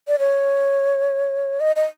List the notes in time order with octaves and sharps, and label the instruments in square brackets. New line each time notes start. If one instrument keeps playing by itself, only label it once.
[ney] D5
C#5
D#5
D#5